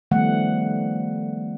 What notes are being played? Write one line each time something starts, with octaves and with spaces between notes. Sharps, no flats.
D#3 F3 G3 A3 B3 F#5